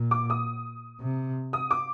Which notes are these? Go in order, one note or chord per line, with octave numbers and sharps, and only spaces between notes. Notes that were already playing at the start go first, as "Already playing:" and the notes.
Already playing: A#2
D6
D#6
C3
D#6
D6